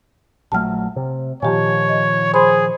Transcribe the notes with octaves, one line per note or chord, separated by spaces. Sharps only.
A#1 F#3 A3 A5 F6
C3
A#2 D#3 F3 G4 C#5 G#5
D#5
G#4 C5 B5 C6